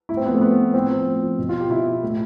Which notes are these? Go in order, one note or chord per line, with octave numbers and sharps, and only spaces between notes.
A2 E4
C4
F3 B3
A3
A2 B3
F3
A2 C4
F3
A2
F3
B2
F4
G4
B2 E4
A2